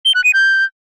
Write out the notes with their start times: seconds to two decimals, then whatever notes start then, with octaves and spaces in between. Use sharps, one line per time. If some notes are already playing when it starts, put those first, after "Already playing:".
0.05 G7
0.15 F#6
0.24 D#7
0.34 G6